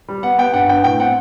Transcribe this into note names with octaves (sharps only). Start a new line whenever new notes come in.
G3
B3 F#5
B3 G5
G2 F#5
B3 G5
A2 G5
C4 F#5